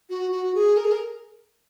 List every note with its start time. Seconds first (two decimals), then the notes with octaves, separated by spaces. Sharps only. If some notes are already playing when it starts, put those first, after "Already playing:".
0.10 F#4
0.32 F#4
0.55 G#4
0.77 A#4
0.85 G#4
0.92 A#4